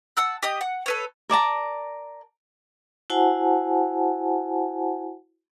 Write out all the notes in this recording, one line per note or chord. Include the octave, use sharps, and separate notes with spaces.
F#5 A5 E6 F#6
G4 D#5 D#6
F#5
A4 B4 C#5
A#4 D5 A5 A#5
E4 F#4 C5 F#5 G#5 A5